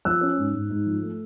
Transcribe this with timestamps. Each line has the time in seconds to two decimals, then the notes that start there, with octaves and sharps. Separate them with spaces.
0.05 F3 E6 F#6
0.21 C#4
0.38 G#2
0.54 G#2
0.70 G#2
0.86 F3
1.02 A3